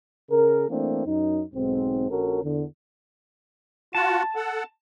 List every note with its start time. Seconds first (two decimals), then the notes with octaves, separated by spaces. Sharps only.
0.30 C#3 G#4 A#4
0.70 E3 A3 A#3 C4 D4
1.06 F#2 D#4
1.54 B1 G#2 C4
2.10 A#1 C#4 F#4 A4 A#4
2.43 E2 D3
3.95 F4 F#4 F#5 A5
4.36 A4 F#5